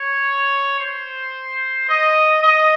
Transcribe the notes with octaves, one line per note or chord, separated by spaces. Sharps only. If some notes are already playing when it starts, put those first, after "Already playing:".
Already playing: C#5
C5
D#5
D#5